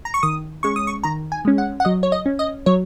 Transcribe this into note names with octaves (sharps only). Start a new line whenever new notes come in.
A#5
C#6
D#3 D#6
G#3 C#4 C#6
D#6
C#6
D#3 A#5
G#5
G#3 C#4
F#5
F#5
F#3 D#5
C#5
D#5
C#4
D#5
F#3 C#5